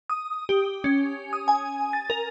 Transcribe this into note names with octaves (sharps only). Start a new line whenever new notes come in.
D#6
G4
C#4
D#6
G#5
A6
A#4